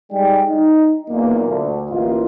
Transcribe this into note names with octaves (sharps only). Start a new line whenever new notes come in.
G3 G#3 D#4 D5 G5
D#4
B1 E2 A#2 A#3
D2
A1 A#3 E4 F4 D#5